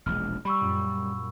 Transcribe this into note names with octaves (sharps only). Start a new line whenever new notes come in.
E1 A#1 G#3 F6
G3 B5 C#6 E6
F#2 A#2